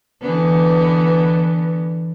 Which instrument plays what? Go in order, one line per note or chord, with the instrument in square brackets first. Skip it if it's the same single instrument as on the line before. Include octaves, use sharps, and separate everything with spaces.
[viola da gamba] D3 E3 B3